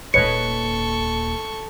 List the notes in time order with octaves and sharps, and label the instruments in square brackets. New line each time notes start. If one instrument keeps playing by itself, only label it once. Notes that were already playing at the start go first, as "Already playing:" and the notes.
[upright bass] D#1 A#3 [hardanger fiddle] A4 C#6 [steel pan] B4 C#5 D#5 [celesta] C#7